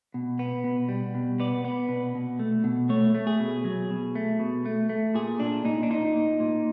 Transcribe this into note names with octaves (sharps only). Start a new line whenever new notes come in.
B2
B3
B2
G3
B2
B3 D5
B3
B2
B2
A3
B2
A3 C#5
A3
G#4
B2
F#3
B2
A3
B2
A3
A3
A#2 G#4
A#2 D4
A#2 D#4
D4
A#2 D#4
A#2
A#2